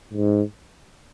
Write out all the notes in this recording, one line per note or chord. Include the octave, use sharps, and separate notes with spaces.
G#2